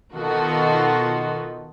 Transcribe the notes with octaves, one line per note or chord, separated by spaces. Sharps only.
B2 D#3 D#4 F4 F#4 A4